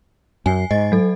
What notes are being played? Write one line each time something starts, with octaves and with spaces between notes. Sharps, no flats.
F#2 G#5 C7
G#2 D#5 A6
F#3 A4